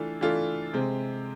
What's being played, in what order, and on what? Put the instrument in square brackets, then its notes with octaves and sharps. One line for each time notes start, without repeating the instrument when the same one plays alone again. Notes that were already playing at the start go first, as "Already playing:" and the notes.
Already playing: [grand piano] E3 A3 D4 F4 A4
E3 A3 D4 F4 A4
C3 G#3 C4